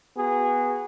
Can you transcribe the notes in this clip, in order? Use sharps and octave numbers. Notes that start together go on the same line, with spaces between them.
B3 F#4 G#4